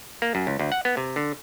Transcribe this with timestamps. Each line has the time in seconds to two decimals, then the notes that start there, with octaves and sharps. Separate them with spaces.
0.22 A#3
0.35 F#2
0.47 C#2
0.59 D2
0.72 F#5
0.85 B3
0.97 C3
1.16 D3